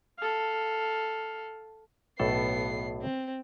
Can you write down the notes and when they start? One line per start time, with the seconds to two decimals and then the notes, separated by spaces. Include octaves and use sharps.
0.18 A4 F5
2.20 B1 A2 B3 A4 C7
3.01 C4